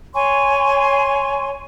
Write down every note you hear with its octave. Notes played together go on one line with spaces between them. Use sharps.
C#5 G#5 C6 C#6